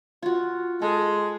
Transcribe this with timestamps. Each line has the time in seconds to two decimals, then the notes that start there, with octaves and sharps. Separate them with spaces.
0.23 F4 F#4
0.82 G#3 A4